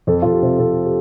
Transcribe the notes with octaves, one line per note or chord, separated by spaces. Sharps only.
F2 A4
F2 F4
G4
C3
C3 A4
G4